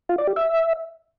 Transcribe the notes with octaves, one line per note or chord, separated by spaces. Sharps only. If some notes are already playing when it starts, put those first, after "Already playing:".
F4
D5
G4
E5